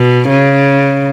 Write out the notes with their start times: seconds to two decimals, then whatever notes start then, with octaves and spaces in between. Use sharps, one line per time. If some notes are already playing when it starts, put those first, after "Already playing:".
Already playing: B2
0.29 C#3